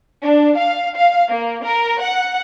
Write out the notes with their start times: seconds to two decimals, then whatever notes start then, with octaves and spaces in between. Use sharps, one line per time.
0.22 D4
0.57 F5
0.96 F5
1.28 A#3
1.64 A#4
2.02 F#5